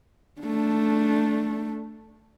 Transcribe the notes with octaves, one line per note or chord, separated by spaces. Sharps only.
A3 D4